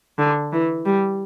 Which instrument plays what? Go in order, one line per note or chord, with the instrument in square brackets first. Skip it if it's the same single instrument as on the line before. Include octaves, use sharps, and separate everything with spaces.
[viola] D3
E3
G3